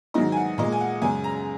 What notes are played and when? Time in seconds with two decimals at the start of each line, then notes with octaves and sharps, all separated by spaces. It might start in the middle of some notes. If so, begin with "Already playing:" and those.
0.14 G#2 D#3 F#3 D#5
0.32 G#5
0.37 F#5
0.58 A#2 G#3 D#5
0.72 G#5
0.81 F#5
1.02 F#2 C#3 G#3 G#5
1.24 A#5